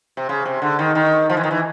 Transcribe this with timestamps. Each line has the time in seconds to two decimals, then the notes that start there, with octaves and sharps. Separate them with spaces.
0.17 C3
0.29 C#3
0.45 C3
0.62 D3
0.79 D#3
0.95 D#3
1.30 F3
1.37 E3
1.44 D#3
1.51 E3